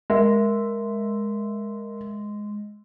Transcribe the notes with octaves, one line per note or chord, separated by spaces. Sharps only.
G#3 A#4 E5